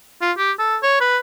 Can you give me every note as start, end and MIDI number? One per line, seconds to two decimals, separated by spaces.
0.21 0.32 65
0.37 0.52 67
0.59 0.77 69
0.82 1.00 73
1.00 1.18 71